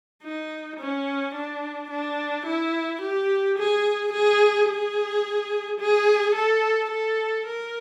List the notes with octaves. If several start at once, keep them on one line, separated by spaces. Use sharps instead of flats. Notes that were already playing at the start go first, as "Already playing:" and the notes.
D#4
C#4
D4
D4
E4
G4
G#4
G#4
G#4
G#4
A4
A4
A#4